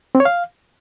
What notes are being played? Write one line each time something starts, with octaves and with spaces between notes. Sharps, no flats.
C4
C#5
F5